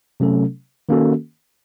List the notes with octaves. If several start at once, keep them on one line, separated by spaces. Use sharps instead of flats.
C3 F#3 A3 C#4 A4
D#3 A#3 C#4 F#4 A4